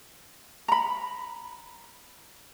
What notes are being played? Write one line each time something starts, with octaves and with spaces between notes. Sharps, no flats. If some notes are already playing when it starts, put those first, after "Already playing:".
A#5 B5